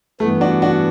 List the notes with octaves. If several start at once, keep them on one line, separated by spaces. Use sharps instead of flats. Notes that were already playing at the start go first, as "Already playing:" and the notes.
G2 E3 A3 B3
D4 F#4
D4 F#4